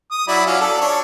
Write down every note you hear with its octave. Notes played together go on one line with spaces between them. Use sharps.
D#6
F#3 E4 D5
F#3 C#4 F4
A4 D5
D4 C#5